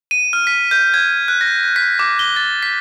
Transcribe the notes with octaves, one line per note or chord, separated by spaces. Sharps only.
D#7
F6
B6
G6
G#6
F#6
A#6
B6
D6
G7
A6
B6